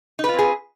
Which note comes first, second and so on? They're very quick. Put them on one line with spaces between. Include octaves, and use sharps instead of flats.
D#4 B4 F4 C4 G#4